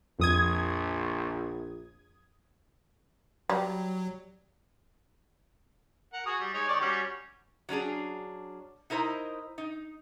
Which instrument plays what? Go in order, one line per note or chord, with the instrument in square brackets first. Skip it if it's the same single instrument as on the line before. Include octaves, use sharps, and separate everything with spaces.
[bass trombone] A#1 [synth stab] F2 D#6 G#6
[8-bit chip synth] F#3 [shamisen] G3
[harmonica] A#4 F#5
F#4 G#4 D#6
G3
G#3 D#4 C#5
D#3 D5 C#6
G3 C#4 F#4
[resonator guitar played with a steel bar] F#3 C#4 D4 G#4
D#4 E4 A#4 C5 D#5
D#4